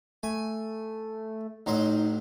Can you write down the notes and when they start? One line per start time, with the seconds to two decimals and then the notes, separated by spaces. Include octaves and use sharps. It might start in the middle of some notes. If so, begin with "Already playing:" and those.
0.23 A3 G#5
1.66 A1 F#3 D#4 C5